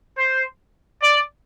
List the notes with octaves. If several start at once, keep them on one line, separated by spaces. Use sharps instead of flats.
C5
D5